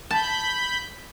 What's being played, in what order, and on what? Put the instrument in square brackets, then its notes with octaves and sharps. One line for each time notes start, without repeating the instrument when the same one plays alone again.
[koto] A5 [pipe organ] B5 G6